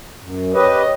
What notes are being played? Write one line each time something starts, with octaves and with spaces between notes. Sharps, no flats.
F#2
G4 B4 C#5 D#5